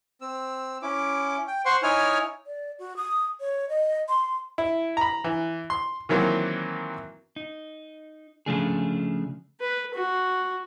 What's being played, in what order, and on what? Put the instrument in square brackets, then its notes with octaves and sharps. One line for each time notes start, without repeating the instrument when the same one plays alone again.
[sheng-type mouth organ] C4 E6
C#4 E4 D6
G5
C5 F#5 C6 C#6
D#4 E4 C#5 G#5 F6
[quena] D5
F#4
D#6
C#5
D#5
C6
[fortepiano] E4
A#5 B5
E3
C6
D#3 E3 F#3 A#3 C4
[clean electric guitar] D#4
C#3 F3 A3 D4 G#4
[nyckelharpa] B4
F#4